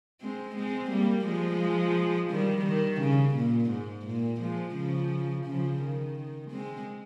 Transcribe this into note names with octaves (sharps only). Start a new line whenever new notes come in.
G#3 C4
G#3 C4
G3 A#3
F3 G#3
D#3 G3
D#3
C#3
A#2
G#2
A#2
F3 G#3
C#3 F3
C#3 F3
D#3
G#3 C4